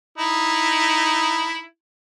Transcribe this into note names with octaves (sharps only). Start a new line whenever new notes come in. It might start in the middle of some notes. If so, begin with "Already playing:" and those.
D#4 E4